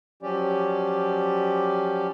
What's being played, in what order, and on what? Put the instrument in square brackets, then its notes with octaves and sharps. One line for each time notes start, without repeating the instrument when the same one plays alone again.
[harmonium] F3 F#3 C#4 G4 D5